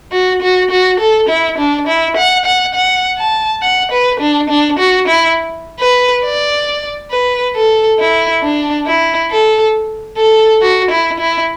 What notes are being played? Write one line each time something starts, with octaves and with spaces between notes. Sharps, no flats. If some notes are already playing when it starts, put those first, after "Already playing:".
F#4
F#4
F#4
A4
E4
D4
E4
F#5
F#5
F#5
A5
F#5
B4
D4
D4
F#4
E4
B4
D5
B4
A4
E4
D4
E4
A4
A4
F#4
E4
E4